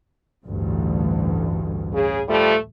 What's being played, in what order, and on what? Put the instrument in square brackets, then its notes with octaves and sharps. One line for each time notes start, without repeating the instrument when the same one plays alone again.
[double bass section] A1 D2 G2
[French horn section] C#3 G#4
F3 G3 A3